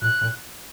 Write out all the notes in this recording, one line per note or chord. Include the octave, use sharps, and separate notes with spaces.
A#2 F#6
A#2